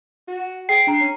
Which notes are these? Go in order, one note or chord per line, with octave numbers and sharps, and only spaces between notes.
F#4
G#4 G5 C7 D7
D4 A#5
C#4